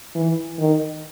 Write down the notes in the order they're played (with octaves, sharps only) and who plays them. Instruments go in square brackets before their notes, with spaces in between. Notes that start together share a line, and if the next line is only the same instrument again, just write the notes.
[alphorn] E3
D#3